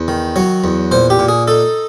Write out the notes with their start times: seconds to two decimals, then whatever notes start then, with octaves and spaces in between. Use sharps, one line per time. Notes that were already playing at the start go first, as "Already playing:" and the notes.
Already playing: E2
0.08 D#3
0.36 F#3 C#5
0.64 E2
0.92 A#2 C5
1.10 G4
1.19 A#2
1.28 G#4
1.48 D#4 A4